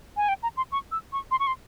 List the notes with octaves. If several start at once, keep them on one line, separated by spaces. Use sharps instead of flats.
G#5
G5
A#5
C6
C#6
E6
C#6
C6
C#6
C6